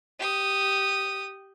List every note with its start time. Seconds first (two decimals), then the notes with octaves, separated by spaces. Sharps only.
0.19 G4 D#6